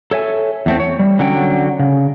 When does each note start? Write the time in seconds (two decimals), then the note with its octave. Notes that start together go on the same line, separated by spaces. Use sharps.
0.11 A4 C#5 E5 G#5
0.66 E2 A3 C4
0.80 C#5
0.99 G3
1.19 D3 F#3 C#4 G5
1.79 C#3